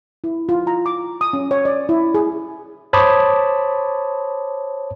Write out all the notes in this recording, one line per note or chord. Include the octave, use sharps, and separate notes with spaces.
E4
F4
A#5
D6
D#6
C#4
C#5
D5
E4
G#4
C5 C#5 A5 B5 D6 D#6